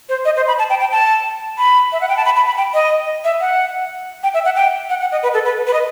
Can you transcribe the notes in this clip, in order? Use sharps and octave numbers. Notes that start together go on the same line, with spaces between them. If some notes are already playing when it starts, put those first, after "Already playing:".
C5
D#5
C5
B5
A5
G5
G5
A5
B5
E5
F#5
G5
A5
B5
B5
B5
G5
D#5
E5
F#5
G5
E5
F#5
G5
F#5
F#5
D#5
B4
A4
B4
B4
D#5